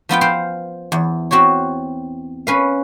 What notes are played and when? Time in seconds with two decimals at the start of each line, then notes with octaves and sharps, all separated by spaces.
0.09 F3 B3 F4 G5
0.21 C5 F5 G5
0.92 E2
1.31 C4 F#4 G4 C#5
2.47 C#4 B4 F5